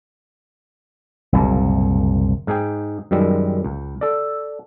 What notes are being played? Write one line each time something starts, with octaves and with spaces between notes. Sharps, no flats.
F#1 C2 A#2
G#2 D#4 G#4 G5
F#2 D#3 G3 G#3
C#2
A4 D5